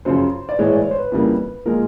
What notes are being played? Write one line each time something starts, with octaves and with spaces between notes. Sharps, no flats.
F#2 C#3 F3 C5
D5
A2 E3 G#3 C#5
D5
C#5
C5
B4
F2 C#3 E3 G3 A#3
A#2 F3 G#3 A#4